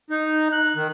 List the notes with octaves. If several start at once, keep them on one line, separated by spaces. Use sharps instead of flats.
D#4
F#6
D#3